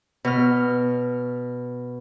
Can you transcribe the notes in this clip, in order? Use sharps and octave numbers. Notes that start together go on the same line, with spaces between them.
B2 F6